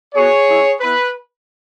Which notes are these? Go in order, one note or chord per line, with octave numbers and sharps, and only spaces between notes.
B3 F#4 G#4 C#5
G#3 C#4 E4
B3 E4 B4